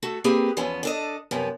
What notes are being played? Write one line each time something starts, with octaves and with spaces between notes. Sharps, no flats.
A3 F#4 A4
A#3 C4 G4 G#4 B4
E2 F3 B3 C#4
D4 A4 D#5
F#2 C3 F3 B3